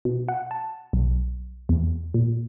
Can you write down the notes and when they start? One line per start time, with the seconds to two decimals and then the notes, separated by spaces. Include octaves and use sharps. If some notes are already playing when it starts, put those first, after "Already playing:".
0.05 B2
0.28 F#5
0.51 A5
0.93 B1
1.69 E2
2.14 A#2